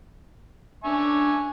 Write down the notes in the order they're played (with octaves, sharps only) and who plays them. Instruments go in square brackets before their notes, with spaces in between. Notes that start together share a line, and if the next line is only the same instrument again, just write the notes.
[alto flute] D4 [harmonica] E5 G#5 C#6